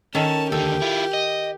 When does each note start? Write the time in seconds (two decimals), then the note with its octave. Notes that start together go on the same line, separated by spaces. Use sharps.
0.15 D#3 C#4 A4 A5
0.52 D#2 D3 G4 A4
0.82 E4 F4
1.13 D#5